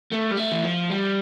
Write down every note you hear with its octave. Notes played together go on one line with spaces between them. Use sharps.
A3
G3
A3
E3
F3
G3